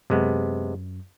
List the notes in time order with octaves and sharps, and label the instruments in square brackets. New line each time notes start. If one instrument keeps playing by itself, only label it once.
[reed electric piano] F#2 [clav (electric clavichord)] C3 G#3 B3